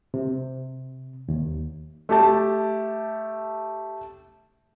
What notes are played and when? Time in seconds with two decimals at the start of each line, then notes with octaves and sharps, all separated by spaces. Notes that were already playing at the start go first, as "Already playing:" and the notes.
0.14 C3
1.28 D#2
2.09 A3 G4 A5